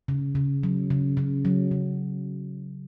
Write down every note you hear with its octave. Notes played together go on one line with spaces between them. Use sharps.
C#3
C#3
F#3
C#3
C#3
F#3
C#3